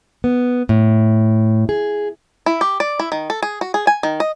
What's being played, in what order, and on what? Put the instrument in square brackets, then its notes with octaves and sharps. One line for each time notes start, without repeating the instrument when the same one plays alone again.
[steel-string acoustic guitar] B3
A2
G#4
[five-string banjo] E4
G4
D5
E4
D#3
A4
G#4
F#4
G#4
G#5
D#3
D#5